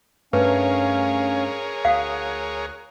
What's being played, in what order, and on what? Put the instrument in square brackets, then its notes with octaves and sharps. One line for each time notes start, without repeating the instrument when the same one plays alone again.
[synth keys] G2 A3 [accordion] C#4 F5 [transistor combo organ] G#4 A#4 C#5 [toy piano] B4
[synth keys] D2 D#6 [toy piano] F5 F#5 [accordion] F#6